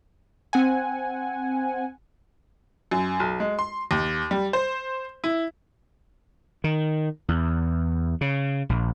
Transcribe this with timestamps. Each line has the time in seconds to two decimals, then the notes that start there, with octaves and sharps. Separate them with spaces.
0.53 C4 F#5 G#5
2.91 F#2
3.20 B1
3.40 G#3
3.59 C6
3.91 D#2
4.31 G3
4.53 C5
5.24 E4
6.64 D#3
7.28 E2
8.21 C#3
8.69 A#1